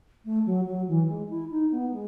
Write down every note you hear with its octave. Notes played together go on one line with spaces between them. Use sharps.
A3
F#3
F#3
E3
G#3
E4
D#4
B3
G#3